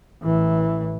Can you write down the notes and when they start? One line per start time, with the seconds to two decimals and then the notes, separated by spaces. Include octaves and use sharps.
0.23 A1 E3